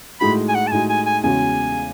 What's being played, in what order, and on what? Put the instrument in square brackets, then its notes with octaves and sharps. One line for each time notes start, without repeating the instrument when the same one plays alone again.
[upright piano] A2 G#3 D#4 F#4 [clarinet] B5
[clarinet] G#5
F#5
A5
[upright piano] A2 G#3 D#4 F#4 [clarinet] G#5
[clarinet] G#5
G#5
[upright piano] E2 C#3 G#3 C#4 F#4 [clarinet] G#5